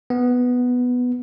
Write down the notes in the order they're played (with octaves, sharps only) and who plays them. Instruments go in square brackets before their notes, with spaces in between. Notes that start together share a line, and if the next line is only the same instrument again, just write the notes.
[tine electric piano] B3